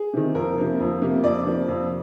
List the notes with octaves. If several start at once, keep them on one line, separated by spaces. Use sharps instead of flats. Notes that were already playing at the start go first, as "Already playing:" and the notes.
Already playing: G#4
C3 D#3
F2 A#4
C3 F3 A#3
F2
C3 F3 A#3
F2 D5
C3 F3 A#3
F2